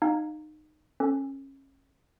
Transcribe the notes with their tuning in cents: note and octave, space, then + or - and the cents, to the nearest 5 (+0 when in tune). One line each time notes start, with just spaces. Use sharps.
D#4 -20 F5 +15
C#4 -25 A4 +0